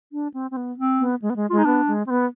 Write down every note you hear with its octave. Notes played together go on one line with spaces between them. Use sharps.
D4
C4
C4
B3
C4
B3
G#3
B3
G#3
G#3 F4
D#4
B3 D4
G#3
C4
B3